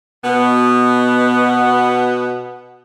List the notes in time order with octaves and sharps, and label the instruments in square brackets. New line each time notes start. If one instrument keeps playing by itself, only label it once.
[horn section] B2 B3